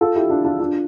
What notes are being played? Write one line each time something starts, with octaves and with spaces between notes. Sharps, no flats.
F4 A4
E4 G4
D4 F4
D4 F4
D4 F4